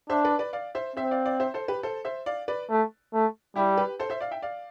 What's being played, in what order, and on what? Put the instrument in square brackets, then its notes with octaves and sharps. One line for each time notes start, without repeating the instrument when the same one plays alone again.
[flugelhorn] D4 [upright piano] C5 E5
[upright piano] B4 D5
B4 D5
D5 F5
C5 E5
[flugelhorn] C4 [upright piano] C5 E5
[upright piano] D5 F5
D5 F5
C5 E5
A4 C5
G4 B4
A4 C5
C5 E5
D5 F5
B4 D5
[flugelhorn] A3
A3
[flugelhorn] G3 [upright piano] E4 G4
[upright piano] G4 B4
A4 C5
C5 E5
D5 F5
E5 G5
D5 F5